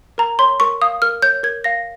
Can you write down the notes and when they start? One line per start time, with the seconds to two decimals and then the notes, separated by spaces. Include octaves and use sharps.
0.18 A#4 A#5
0.39 C#5 C6
0.60 A#4 C#6
0.82 F5 D#6
1.02 A#4 F6
1.22 C#5 G6
1.43 A#4 G#6
1.64 F5 A#6